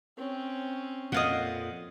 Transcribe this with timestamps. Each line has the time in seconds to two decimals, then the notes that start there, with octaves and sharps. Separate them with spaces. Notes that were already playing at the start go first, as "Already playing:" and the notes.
0.18 C4 C#4
1.12 F2 A#2 D#5 F5 F#5